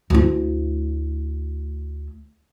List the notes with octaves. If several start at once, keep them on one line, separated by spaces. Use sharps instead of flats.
D2 E4